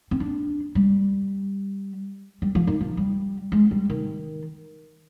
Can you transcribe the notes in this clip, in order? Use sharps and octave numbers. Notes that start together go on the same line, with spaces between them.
C4
D4
G3
G3
F3
D#3
F3
G3
G#3
G3
D#3